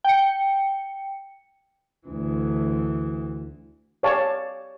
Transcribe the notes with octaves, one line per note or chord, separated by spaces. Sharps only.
G5 C#7
D2 E3
G4 C#5 D5 F5 G#5 A5